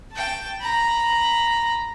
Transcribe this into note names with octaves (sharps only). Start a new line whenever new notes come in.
G5 A5
A#5 B5